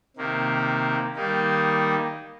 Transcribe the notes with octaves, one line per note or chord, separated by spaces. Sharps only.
C3 D#3 A#3
D#3 G3 A#3 D#4